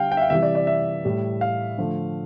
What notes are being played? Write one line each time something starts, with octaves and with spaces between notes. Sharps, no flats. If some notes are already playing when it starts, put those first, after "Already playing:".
Already playing: D3 G3 F5 G5
G5
E5
F5
C3 E3 G3 E5
D5
D5
E5
A2 G3
F5
D3 F3 A3